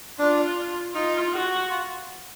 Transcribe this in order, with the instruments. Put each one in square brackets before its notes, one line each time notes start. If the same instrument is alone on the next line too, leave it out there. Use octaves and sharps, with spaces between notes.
[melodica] D4 [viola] F4
[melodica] D#4 [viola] F4
[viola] F#4
[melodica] F4